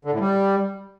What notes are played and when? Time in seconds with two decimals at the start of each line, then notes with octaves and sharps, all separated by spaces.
0.05 D3
0.12 A2
0.20 G3